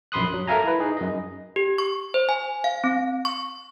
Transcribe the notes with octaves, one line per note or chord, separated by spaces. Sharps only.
A#1 F#2 B5 C6 D#6 F#6
F#3
A4 A#4 E5 F5 G#5 A#5
E4 B4
D#4 G#4
F#2 D#5
G4
C#6
C5
G#5
F5
C4
C#6